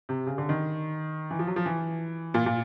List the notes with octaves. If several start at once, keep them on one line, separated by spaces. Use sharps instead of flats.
C3
C#3
D3
D#3
E3
F3
F#3
F3
E3
A#2
A#2